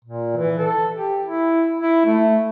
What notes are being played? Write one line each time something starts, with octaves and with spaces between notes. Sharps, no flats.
A#2
E3
A4
G4
E4
E4
A3